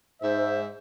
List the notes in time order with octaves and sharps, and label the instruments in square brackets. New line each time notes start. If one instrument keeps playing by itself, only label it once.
[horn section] G#2 E5 [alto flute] C5